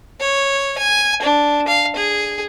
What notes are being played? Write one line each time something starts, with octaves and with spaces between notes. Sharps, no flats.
C#5
G#5
D4
F5
G#4